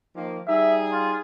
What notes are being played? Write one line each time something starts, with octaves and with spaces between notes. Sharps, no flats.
D#3 F3 A#3
G3 D#4 G#4 E5
F4